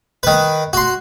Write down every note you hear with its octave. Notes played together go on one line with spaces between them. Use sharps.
D#3 B4
F#4 C6